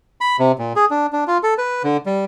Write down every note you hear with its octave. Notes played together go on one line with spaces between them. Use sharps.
B5
C3
A#2
G#4
D4
D4
F4
A4
B4
D3
G3